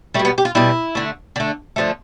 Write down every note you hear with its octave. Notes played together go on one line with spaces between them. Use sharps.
G3 A3
B2
B3
G4
F4
B2 G3 E4
D3 A3
D3 A3
D3 F3 A3